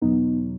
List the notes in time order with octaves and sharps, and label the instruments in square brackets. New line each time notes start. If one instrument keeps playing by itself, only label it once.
[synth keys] E2 B2 F#3 B3 D#4